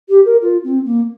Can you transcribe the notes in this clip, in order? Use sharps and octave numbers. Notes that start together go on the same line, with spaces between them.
G4
A#4
F4
C4
A#3